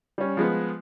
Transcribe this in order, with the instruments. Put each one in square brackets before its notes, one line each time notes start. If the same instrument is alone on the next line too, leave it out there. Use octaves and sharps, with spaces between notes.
[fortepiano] G3 C#4
F3 G#3 B3